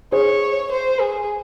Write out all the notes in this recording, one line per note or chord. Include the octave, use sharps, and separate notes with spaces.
G#4 C5 C#5
C5
G#4